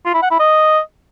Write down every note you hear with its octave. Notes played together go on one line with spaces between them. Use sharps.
F4
E4
F#5
E4
D#5